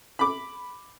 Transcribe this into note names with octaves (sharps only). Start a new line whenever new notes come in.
B5 D6